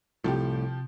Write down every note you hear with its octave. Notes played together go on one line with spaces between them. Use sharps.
C2 A2 C3 F3 G4